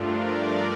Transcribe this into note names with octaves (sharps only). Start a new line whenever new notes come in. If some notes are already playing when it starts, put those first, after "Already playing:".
Already playing: G2 F3 A3 D4 F4 A#4 D5